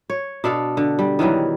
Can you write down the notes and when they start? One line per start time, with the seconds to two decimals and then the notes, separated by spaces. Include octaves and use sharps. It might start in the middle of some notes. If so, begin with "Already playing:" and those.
0.10 C#5
0.44 B2 D4 A4 F5
0.77 D3
0.99 G3
1.19 D#3 E3 F#3 G3